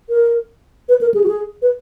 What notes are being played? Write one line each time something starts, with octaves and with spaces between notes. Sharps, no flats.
A#4
B4
A#4
G#4
F#4
G#4
B4